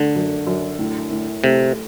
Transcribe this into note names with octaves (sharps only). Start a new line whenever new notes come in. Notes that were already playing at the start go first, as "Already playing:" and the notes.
Already playing: D3 A3
F#2
F#2
A2
A2
C3 A3